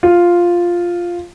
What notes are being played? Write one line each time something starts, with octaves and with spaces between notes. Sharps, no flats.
F4